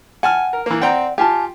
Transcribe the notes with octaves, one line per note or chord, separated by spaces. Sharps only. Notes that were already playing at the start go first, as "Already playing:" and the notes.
F#5 G#5 A5 F6
A#4
E3 A#3
C4 D5 F#5 G5 A#5
F4 G4 G#5 A5